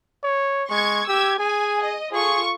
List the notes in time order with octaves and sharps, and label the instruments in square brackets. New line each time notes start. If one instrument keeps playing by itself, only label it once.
[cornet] C#5
[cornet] G#3 [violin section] C#6 G#6
[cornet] G4 [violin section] E6 G#6
[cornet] G#4 [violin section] G#5
[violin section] D#5
[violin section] F4 A4 C#6 [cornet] G#4